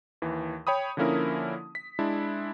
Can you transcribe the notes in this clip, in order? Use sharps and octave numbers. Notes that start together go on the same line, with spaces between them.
D#2 E3
C#5 G5 B5 D#6
D3 F3 A#3 C#4 E4 A#4
B6
G#3 D4 E4